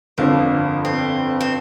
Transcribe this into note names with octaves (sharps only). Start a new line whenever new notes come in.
G1 F2 D3 F3 A#3 C4
C4
C4